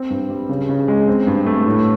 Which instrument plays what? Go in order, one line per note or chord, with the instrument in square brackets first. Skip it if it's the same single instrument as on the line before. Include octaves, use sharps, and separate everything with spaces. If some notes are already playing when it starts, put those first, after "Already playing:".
Already playing: [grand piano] C4
G2
G3
C#3
C#3
G#3
C4
G2
A3
A2